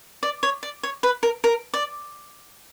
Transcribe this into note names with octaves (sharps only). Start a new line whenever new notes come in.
D5
C#5
D5
C#5
B4
A#4
A#4
D5